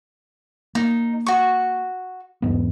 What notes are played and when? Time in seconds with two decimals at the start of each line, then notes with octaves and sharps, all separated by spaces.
0.75 A#3 D#4
1.26 F#4 C#6
2.42 E2 G#2 B3